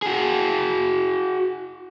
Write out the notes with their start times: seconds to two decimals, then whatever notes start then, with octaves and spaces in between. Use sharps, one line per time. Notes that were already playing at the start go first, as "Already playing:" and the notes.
0.02 F#4 G#4